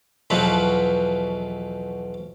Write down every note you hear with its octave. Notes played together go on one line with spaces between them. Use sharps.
B1 E2 B2 F3 F#3 B4